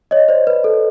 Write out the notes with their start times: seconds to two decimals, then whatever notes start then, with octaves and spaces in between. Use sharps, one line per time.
0.11 C#5 D#5
0.29 C5 D5
0.47 B4
0.64 A4